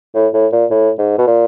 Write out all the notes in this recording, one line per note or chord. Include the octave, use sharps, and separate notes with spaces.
A2
A2
A#2
A2
G#2
B2
A#2